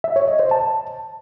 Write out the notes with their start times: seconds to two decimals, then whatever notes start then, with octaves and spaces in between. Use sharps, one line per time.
0.04 E5
0.16 C#5
0.28 D#5
0.39 C5
0.51 A5